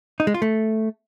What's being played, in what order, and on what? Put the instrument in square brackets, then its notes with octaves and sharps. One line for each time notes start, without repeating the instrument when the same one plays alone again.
[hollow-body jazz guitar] D#4
G#3
F4
A3